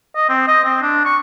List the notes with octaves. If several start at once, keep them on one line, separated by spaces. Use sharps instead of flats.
D#5
C4
D#5
C4
D4
C#6